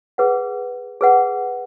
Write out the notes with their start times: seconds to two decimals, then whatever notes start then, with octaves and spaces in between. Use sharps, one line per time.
0.18 G#4 B4 F#5
1.01 G#4 B4 F#5